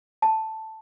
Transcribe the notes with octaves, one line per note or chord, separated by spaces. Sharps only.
A5